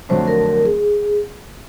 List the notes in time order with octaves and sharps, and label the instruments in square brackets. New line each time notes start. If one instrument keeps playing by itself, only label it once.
[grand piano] F2 D3 F#3 A3 D4 [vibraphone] C5
[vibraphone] A#4
A#4
G#4